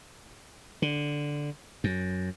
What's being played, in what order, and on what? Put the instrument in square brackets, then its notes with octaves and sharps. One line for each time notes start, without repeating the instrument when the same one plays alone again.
[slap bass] D3
F#2